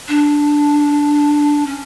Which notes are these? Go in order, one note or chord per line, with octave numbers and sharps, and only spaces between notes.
D4
C#4